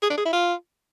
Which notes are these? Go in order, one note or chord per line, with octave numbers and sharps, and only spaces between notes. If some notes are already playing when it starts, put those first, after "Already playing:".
G#4
D4
G#4
E4
F4